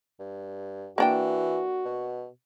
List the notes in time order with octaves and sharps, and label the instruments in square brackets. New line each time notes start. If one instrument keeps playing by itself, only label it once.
[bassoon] G2
[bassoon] E3 [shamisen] A#3 D4 G5 [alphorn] F#4
[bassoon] B2